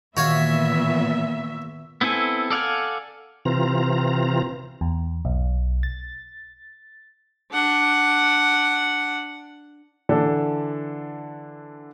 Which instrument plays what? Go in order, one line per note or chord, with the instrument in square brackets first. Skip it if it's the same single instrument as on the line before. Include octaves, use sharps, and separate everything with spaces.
[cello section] A#2 E3 B3 [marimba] D#3 [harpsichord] F#4 C#5 F5 [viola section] E5
[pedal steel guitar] B3 C4 E4 A4 G#5
A4 D5 F5 F#5 G#5
[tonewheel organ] C3 E3 C4 F4 A#5
[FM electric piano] E2
B1
A6
[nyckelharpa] D4 F#5
[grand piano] D3 E3 D4 A4